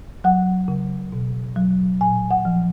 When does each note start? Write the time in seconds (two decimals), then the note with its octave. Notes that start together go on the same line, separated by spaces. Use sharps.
0.24 F#3 F#5
0.68 C#3
1.12 B2
1.56 F#3
2.01 A#2 G#5
2.31 F#5
2.45 F3